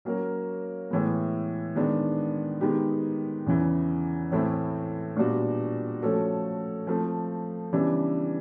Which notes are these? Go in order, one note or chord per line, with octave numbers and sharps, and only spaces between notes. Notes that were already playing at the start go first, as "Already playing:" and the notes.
F#3 A#3 C#4 F#4 A#4
A2 E3 G#3 B3
D#3 G#3 B3 D4
D#3 G#3 B3 D#4 G4
E2 C#3 E3
A2 E3 A3 C4 E4
A#2 G3 B3 D4 F#4
F3 A3 C#4 F#4 A4
F3 A3 C4
C#3 E3 G3 B3 D4